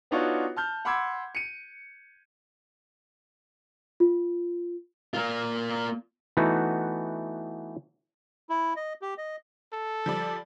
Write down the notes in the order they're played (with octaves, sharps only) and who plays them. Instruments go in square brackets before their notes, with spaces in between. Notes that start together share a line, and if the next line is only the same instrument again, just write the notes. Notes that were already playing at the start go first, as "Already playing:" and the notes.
[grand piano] B3 D4 D#4 F4 F#4 C#5
A5 F6 G6
F#5 B5 C6 D6 E6 G#6
C#7 D#7
[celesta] F4
[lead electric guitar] A#3 F4
[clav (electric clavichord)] E3 A3 B3 D#4 F#4
[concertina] E4
D#5
G4
D#5
[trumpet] A4
[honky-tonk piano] F3 G3 D5